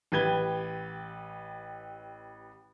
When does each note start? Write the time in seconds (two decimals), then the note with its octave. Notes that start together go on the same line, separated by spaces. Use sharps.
0.12 A1 G4 B4 G#6 G7